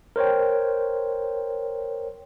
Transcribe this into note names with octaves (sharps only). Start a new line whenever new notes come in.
A#4 C5 C#5 G5